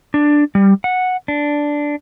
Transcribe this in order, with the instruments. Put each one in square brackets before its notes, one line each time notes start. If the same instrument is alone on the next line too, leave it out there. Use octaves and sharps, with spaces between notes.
[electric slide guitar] D4
G3
F#5
D4